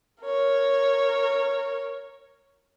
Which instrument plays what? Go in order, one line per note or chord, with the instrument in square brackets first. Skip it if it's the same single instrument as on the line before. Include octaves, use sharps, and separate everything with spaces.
[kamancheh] A#4 C#5